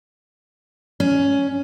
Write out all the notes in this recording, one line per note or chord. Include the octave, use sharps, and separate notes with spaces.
C#4